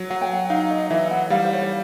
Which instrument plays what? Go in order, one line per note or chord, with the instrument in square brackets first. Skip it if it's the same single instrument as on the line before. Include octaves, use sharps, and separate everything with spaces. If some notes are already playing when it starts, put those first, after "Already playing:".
Already playing: [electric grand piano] F#3
[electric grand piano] F#3 [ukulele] F#5
[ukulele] G5
F#5
[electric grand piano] D#4 [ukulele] F5
[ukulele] D#5
[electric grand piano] E3 [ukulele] E5
[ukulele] F#5
[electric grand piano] G3 [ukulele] F5
[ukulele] C5
C#5
D5